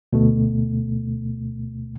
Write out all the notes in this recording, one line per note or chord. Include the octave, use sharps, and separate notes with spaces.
D2 B2 A3